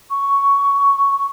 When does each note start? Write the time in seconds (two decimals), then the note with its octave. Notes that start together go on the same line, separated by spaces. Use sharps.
0.10 C#6